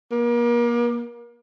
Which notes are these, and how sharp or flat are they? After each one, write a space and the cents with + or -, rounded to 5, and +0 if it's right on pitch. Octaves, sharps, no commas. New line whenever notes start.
A#3 +35